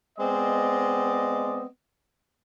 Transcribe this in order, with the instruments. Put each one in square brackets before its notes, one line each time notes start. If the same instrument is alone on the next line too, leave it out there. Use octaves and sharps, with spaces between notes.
[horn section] G#3 B3 C4 C5 D5 D#5